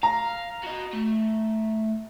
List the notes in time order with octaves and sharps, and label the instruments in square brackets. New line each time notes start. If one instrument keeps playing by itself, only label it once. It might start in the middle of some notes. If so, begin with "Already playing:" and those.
[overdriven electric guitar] F5 [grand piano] A#5
[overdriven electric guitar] F#4 D#5
A3